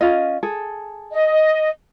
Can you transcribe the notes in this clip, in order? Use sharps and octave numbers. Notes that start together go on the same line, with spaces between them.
C#4 F4 D#5
G#4 A4
D#5